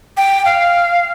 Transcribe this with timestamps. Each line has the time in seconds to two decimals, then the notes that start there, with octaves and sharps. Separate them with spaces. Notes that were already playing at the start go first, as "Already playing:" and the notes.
0.17 G5
0.45 F5